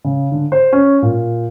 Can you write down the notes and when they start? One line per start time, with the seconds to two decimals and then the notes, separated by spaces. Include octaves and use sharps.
0.04 C#3
0.32 D3
0.52 C5
0.73 C#4
1.02 A#2